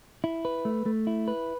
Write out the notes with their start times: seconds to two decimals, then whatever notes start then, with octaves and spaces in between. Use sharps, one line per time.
0.24 E4
0.45 B4
0.65 A3
0.86 A3
1.07 E4
1.28 B4